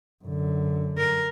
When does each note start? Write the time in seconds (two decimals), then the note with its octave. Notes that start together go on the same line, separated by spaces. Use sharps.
0.25 F#2 D3
0.98 A#4